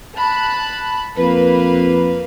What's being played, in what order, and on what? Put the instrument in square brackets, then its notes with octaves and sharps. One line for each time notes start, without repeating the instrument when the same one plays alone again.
[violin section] A5 B5 F#6
[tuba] F2 [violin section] A#3 B4